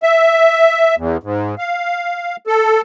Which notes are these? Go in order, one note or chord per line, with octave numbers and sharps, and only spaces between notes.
E5
E2
G#2
F5
A4